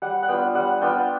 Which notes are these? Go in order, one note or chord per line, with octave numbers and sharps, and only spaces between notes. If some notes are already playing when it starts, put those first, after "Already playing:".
G3 F#5
F#5
B3 D4 F4 G5
G3 F#5
B3 D4 F4 G5